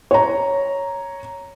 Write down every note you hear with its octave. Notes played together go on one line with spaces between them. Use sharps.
C#5 A#5